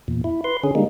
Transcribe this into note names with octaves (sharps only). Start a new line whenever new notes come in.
E2 A#2
E4
B4 C6
D3 C#4 G#4
D3 G3 G#3 A#3 D#4